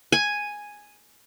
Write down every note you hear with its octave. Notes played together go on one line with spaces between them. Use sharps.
G#5